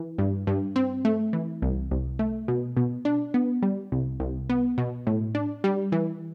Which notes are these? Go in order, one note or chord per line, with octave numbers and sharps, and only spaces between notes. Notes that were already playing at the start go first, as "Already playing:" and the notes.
Already playing: E3
G2
G2
C4
A3
E3
C2
C2
A3
B2
B2
D4
B3
G3
C2
C2
B3
B2
A2
D4
G3
E3